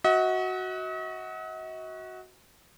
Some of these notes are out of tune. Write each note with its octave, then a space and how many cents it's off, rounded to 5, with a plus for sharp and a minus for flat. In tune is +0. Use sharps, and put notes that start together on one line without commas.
F#4 +0 D#5 +45